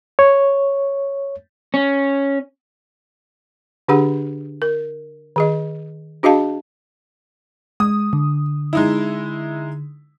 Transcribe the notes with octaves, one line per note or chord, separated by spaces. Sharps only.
C#5
C#4
D3 D4 G4 G#4 F#5
A#4
D#3 G#4 D#5
D4 F#4 G#4 D#5 F5 A5
G#3 D#6
D3
G#3 D#4 E4